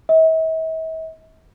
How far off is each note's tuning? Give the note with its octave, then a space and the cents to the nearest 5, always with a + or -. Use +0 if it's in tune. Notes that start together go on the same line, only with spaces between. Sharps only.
E5 -45